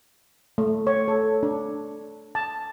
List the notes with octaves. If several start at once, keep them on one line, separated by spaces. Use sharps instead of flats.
A3
C#5
A4
D4
A5